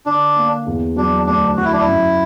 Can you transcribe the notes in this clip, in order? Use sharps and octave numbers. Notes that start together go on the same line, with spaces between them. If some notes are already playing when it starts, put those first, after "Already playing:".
D3 D4
A#3
E2
F#3 D4
D2 D4
F#3 F#4
E4
D4
E4
F#2